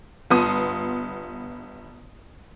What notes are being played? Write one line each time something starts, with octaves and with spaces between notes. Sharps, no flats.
G1 B3 F4 C6 D#6